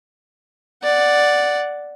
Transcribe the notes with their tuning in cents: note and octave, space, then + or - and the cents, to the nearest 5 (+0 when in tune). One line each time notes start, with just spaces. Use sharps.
D5 +0 F#5 +0